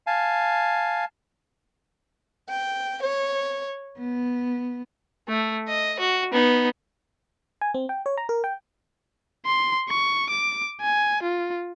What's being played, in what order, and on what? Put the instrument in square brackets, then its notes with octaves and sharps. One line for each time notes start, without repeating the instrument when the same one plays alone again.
[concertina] F5 G#5 A5
[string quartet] G5
C#5
B3
[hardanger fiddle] A3
D#5
F#4
B3 D#4
[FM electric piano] G#5
C4
G5
C#5
A#5
A#4
G5
[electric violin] C6
C#6
D6
G#5
F4